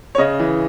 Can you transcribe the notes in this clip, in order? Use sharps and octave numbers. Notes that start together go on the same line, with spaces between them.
C#5
C#3 D#5
E3